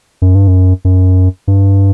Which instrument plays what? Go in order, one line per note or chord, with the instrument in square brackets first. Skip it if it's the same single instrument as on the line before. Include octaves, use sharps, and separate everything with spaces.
[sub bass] F#2
G2
F#2
F#2
G2